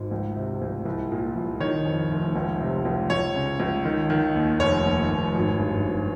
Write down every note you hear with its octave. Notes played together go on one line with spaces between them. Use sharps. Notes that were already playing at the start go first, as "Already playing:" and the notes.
Already playing: G#1 G#2
C#2
C3
C#2
C2
A#2
C2
D#3 C#5
F2
F1
C#2
C3
C#2
C#2 C#5
C#3
C#2
D#3
D#3
D#2
F1 C#5
D#2
F1
G#1
G2
G#1